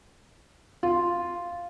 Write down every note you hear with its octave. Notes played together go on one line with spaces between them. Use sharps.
F4